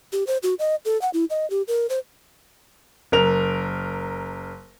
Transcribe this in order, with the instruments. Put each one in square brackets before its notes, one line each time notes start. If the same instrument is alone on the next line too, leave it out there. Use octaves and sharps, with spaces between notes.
[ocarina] G4
C5
F#4
D#5
A4
F#5
E4
D#5
G4
A#4
C5
[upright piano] F#1 A#4 F7